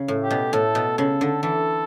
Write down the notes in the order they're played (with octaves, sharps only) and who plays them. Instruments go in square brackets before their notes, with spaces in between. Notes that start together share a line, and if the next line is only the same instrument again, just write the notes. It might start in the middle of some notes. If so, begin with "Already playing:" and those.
Already playing: [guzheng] C#3
A2
[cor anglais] G4
[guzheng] B2
[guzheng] A2 [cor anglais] A4
[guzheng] B2
[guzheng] C#3 [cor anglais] A4
[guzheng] D3
[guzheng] E3 [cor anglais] A4